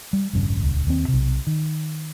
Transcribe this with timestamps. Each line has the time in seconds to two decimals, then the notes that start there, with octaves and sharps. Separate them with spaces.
0.13 G3
0.33 E1 A1 G2 C#3
0.62 D#1 C#2
0.87 D#2 C4
1.08 B1 C3
1.47 D#3